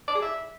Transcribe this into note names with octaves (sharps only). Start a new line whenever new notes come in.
D5
G#4
E5